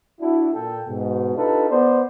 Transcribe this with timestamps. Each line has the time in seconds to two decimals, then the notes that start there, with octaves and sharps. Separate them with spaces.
0.20 D4 E4 F#4
0.53 A#2 A4 G5
0.88 G#2 B2
1.36 D4 D#4 F4 G4 A4 B4
1.70 B3 C5 D5